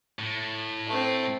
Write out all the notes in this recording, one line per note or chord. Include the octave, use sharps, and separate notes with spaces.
A2
A3 C4